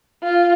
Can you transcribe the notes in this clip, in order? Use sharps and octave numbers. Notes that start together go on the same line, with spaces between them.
F4